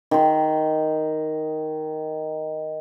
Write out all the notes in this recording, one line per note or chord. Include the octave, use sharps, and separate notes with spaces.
D#3 C6